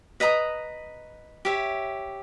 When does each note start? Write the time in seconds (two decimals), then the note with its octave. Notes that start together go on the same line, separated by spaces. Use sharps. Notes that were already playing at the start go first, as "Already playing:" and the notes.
0.20 B4 D#5 A#5 D#6
1.45 G4 C#5 E5